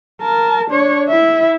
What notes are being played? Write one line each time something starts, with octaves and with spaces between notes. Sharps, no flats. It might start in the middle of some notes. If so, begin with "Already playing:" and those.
A#4 A5
D4 C#5
E4 E5